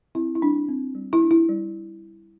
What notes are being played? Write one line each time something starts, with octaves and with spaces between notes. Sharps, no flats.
C4 E4
E4
G3 D4
C4
G3
E4
D4
E4
G3